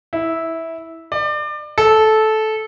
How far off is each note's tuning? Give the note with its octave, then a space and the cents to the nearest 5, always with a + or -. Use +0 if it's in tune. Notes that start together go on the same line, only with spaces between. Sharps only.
E4 -10
D5 +30
A4 -15